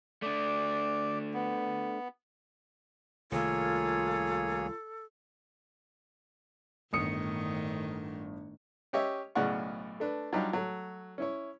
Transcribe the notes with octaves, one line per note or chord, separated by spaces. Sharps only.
A3 D4 D5
B3
C2 D#3 A3 A#3 F4 G#4 A4 C#5
G1 A2 D#3 D#6 C#7
C#4 G4 C#5 D#5 E5
B1 A2 C#3 D5 F#5 C#6
A3 D4 B4
F#3 G3 D4 D#4 F4 G4
F#3 A3
C#4 E4 C#5